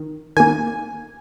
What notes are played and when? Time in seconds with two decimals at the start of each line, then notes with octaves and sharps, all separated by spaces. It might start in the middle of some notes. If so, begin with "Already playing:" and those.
Already playing: D#3
0.37 D#3 A#3 G#5